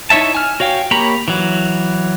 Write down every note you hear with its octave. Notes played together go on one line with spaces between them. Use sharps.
D#4 E4 C#5 E5 A5
G#5 F6
F#4 C#5 F5 G5
A#3 G4 C#5 A#5 B5
E3 F#3